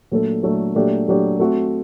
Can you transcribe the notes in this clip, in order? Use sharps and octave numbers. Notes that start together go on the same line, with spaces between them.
A#2 F#3 A3 D4 A4
A#2 F#3 A3 D4 A4
A#2 F#3 A3 D4 G4
A#2 F#3 A3 D4 G4
A3 C4 F#4